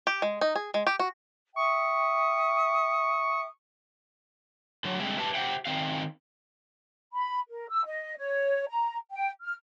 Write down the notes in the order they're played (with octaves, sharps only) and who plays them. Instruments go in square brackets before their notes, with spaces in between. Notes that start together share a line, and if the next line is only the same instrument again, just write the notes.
[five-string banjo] G4
G#3
D#4
G#4
G#3
G4
F#4
[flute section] E5 G5 D#6 [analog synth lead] C#6
[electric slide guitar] D3 F#3
D3 G3 G#3 C4 G#4 E5
G4 B4 E5 A5
G4 C5 E5 F#5 G5
D#3 G#3 C4 F5
[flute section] B5
A#4
E6
D#5
C#5
A#5
G5
F6